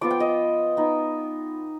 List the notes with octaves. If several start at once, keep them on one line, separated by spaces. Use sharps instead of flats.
F3 B3 F4 D6
G5
D#5
B3 D#4